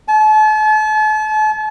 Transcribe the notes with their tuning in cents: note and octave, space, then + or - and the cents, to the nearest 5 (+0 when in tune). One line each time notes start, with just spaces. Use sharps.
A5 -40